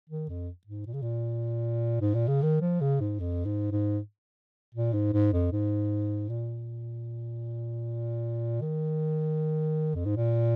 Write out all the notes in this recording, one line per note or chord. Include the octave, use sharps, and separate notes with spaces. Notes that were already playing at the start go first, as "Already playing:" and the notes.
D#3
F2
G#2
A#2
C#3
A#2
G#2
A#2
C#3
D#3
F3
C#3
G#2
F2
G#2
G#2
A#2
G#2
G#2
F2
G#2
A#2
D#3
F2
G#2
A#2